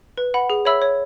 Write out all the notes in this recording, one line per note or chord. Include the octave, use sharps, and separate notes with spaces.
B4
F#5 B5
G#4
C#5 E5 B5 E6
C#5